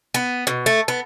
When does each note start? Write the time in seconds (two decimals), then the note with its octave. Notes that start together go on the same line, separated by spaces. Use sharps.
0.14 B3
0.47 B2
0.66 A3
0.88 B3